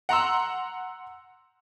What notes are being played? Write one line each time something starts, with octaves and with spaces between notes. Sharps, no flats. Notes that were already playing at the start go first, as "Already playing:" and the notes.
F#5 A#5 C6 E6